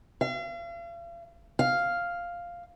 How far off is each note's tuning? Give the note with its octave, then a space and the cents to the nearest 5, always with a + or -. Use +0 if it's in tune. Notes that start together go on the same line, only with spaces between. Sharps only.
F5 -40
F5 +0